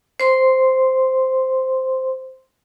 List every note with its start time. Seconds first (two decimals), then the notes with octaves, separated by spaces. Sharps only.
0.20 C5 C6